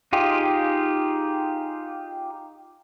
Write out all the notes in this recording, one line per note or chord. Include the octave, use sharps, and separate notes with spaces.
D#4 F4 G4 G#4